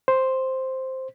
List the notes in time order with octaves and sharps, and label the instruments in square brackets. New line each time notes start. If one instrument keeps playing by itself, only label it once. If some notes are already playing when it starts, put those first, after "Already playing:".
[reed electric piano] C5